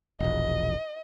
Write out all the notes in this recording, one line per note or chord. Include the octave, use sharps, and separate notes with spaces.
E1 A#1 D#5